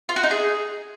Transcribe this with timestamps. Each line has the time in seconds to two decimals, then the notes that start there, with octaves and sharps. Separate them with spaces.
0.09 F4
0.16 F#4
0.23 D#4
0.31 G#4